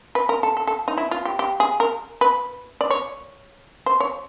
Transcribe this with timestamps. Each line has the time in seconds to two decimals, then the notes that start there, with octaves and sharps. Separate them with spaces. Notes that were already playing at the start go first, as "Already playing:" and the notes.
0.15 B4
0.29 A#4
0.43 A4
0.57 A4
0.67 A4
0.88 D#4
0.98 E4
1.11 F4
1.25 G4
1.39 G4
1.60 G#4
1.80 A#4
2.21 B4
2.81 D5
2.90 C#5
3.86 C5
4.00 C#5